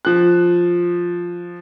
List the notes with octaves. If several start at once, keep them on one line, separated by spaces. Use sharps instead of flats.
F3 F#6